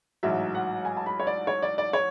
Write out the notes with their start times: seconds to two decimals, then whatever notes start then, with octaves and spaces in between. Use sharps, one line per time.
0.23 A1 G#2 F#3 E5
0.55 F#5
0.85 G#5
0.97 A5
1.06 B5
1.20 C#5
1.27 D5
1.47 C#5
1.62 D5
1.78 D5
1.93 C#5